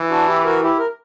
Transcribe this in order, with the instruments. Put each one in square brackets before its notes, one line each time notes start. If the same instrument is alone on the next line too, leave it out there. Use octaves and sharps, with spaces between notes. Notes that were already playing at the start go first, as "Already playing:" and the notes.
Already playing: [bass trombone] E3
[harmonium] D4 F#4
E4 G4
F#4 A#4
E4 G4
A#4